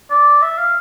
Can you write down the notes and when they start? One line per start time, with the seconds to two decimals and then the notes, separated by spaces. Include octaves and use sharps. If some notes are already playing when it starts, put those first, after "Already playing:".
0.10 D5
0.42 E5
0.58 F5